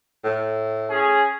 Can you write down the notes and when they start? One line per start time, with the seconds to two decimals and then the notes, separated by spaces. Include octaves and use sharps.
0.24 A2
0.89 C#4 G#4